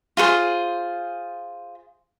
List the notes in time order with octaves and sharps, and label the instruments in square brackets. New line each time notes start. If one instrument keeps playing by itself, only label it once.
[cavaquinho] F4 G#4 B4 C5